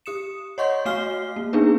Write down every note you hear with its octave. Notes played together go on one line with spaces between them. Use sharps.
G4 D#6 C#7 E7
C#5 D#5 F#5 C6 C#6 G6
A3 F#4 F5 F6 C7 G7
A#3
A#3 B3 D4 D#4 G#4 B4